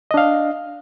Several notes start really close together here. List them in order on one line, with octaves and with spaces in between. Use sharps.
D#5 D4 F5